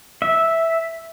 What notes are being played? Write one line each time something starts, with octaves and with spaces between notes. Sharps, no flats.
E5